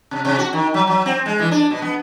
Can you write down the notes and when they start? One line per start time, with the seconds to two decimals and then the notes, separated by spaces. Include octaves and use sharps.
0.11 C3
0.25 C3
0.38 F#4
0.53 D#3
0.74 F#3
0.87 F#3
1.06 C4
1.26 G#3
1.39 E3
1.51 D4
1.71 B2
1.82 B3